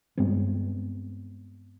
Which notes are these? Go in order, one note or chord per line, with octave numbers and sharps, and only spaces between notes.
G2 G#3 B3 C4